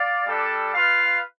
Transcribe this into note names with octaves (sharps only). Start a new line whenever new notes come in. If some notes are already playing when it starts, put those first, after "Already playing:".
Already playing: D5 F5
G3 D4 A4
F4 B4 F5